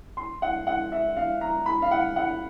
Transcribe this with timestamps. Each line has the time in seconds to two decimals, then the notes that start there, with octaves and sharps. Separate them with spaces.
0.17 C6
0.42 F#5
0.67 F#5
0.92 E5
1.17 F5
1.41 A#5
1.66 B5
1.82 F5
1.91 F#5
2.16 F#5